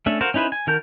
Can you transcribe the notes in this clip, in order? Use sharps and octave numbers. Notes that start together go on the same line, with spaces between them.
A3 C#4 D4 E5
F#4 A#4 C5 F5
C#4 D#4 E4 B4 C5
G#5
D#3 F#4 A#4 A5 G6